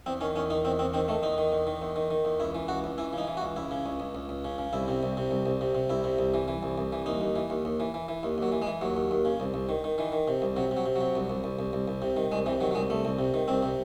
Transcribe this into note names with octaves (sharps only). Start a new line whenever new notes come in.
E2 C4
D#3 C#4
E2 C#4
D#3 D#4
E2 C4
E2 C4
D#3 C4
D#3 A3
E2 D#4
D#3
E2
D#3
E2
D#3
D#3
E2
C#2 E4
E3
C#2 F#4
C#2
E3 E4
C#3
D#4
E3
F#4
C#2
C#2 E4
C#3
C#2
C#2
C#2
C#2
C#3
C#3
C2 E4
C3
C2
C3
C2
C2
C3
C3
C2 E4
C3
C2
E3
E3
C2
C2
E3
D#2 D#4
D#2
E3
D#2
D#2
E3
E3
E3
D#2
D#2 F#3
E3
G#3
E3
D#2 F#3
D#2
D#2
C#3
C2
C2
D#3
D#3
D#3 E3
D#3
C3
C2
C3 F#3
C3
F#3
C3
F#3
C3
C2
C2
C2
C2
C2
C2
C3
D#3
C2 G#3
C3 E3
D#3 F#3
F#3
C2 G#3
C2 A3
C2
C3
D#3
C2 C4
C3